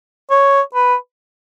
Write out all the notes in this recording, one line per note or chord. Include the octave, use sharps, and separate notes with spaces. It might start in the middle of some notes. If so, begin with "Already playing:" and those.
C#5
B4